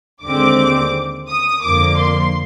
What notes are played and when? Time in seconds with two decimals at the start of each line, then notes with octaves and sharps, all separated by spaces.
0.24 D#2 D3 G#3 C4 D6
1.29 D#6
1.63 F2 D3 F3 A#3 D6
1.98 C6